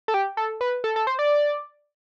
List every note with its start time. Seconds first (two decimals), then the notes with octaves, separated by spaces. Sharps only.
0.08 A4
0.14 G4
0.37 A4
0.61 B4
0.84 A4
0.96 A4
1.07 C5
1.19 D5